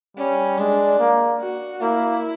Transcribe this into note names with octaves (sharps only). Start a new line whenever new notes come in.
G3 C#4
G#3 D4
A#3
F#4
A#3 E4